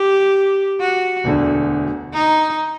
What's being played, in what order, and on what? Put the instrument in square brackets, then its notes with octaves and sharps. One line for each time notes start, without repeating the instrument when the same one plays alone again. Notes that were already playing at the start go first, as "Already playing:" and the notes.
Already playing: [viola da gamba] G4
F#4
[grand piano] E1 D2 D3
[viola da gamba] D#4